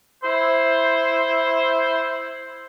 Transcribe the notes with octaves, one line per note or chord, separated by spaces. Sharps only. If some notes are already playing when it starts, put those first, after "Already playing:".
E4 C5